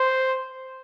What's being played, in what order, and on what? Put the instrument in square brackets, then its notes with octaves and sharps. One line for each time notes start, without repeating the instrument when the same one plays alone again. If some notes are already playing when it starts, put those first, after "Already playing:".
Already playing: [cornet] C5